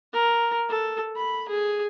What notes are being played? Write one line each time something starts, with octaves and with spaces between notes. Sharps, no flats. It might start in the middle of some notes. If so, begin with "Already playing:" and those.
A#4
A4
B5
G#4